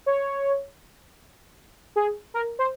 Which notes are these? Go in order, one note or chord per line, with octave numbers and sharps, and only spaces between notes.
C#5
G#4
A#4
C5